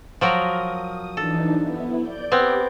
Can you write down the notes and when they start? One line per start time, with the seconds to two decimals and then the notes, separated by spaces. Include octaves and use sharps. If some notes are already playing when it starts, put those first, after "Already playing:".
0.21 F3 F#3 A#4 D#6
1.17 E3 D4 D#4 A4
1.61 B3 E4
2.02 D5 G6
2.32 B3 C4 G4 D6